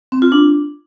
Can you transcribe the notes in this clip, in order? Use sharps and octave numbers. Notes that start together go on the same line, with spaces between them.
C4
F4
D4